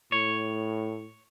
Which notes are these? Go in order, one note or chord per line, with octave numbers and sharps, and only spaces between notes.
A2 C#5